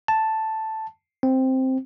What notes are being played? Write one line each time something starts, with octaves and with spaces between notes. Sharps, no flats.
A5
C4